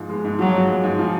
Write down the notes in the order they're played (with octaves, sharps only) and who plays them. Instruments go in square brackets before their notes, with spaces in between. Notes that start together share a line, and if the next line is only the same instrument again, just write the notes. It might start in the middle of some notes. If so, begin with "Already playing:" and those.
Already playing: [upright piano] G#2 F3
G#3
G#2
[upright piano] F3 [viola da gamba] F#3
[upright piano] G#2
G#3
G#2
F3